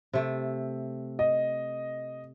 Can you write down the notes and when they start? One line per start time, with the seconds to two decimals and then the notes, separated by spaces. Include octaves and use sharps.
0.13 C3 A3
1.19 D#5